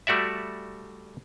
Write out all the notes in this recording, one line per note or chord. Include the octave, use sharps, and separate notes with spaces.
G3 A3 F#4 D5 E5